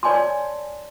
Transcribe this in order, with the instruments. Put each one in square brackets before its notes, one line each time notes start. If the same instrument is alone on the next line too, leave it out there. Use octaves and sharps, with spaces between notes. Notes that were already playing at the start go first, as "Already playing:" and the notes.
[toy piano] C#5 D5 G#5 A5 C6